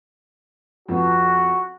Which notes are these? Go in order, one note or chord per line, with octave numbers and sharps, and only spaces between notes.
F2 F3 B3 F#4